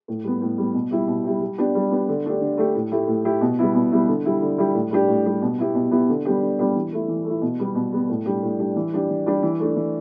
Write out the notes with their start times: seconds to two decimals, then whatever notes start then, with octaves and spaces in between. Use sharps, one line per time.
0.08 A2
0.24 G3 B3
0.41 A2
0.58 G3 B3
0.74 B2
0.91 G3 E4 G4
1.08 B2
1.24 G3 E4 G4
1.41 G3
1.58 B3 D4 G4
1.75 G3
1.91 B3 D4 G4
2.08 D3
2.25 A3 D4 G4
2.42 D3
2.58 A3 D4 G4
2.75 A2
2.91 A3 E4 G4
3.07 A2
3.24 A3 E4 G4
3.41 B2
3.59 G3 B3 E4
3.75 B2
3.92 G3 B3 E4
4.08 D3
4.25 G3 E4 G4
4.42 D3
4.58 G3 E4 G4
4.75 A2
4.91 G3 D4 G4
5.08 A2
5.25 G3 D4 G4
5.42 B2
5.58 B3 E4 G4
5.75 B2
5.91 B3 E4 G4
6.09 D3
6.25 G3 B3 D4 G4
6.42 D3
6.59 G3 B3 D4 G4
6.76 E3
6.92 A3 E4
7.08 E3
7.25 A3 E4
7.42 B2
7.59 G3 B3
7.75 B2
7.92 G3 B3
8.09 A2
8.25 G3 D4 G4
8.43 A2
8.58 G3 D4 G4
8.76 E3
8.92 G3 D4 G4
9.09 E3
9.26 G3 D4 G4
9.42 E3
9.59 A3 D4
9.76 E3